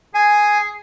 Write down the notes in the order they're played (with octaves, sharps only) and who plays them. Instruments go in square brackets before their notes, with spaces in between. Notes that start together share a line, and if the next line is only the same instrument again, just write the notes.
[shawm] G#4 [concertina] G#5